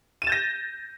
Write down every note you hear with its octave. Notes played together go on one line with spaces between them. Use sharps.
G6 A6 A#6 D#7 E7